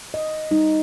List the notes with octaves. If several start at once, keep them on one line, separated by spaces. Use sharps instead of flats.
D#5
G3 D#4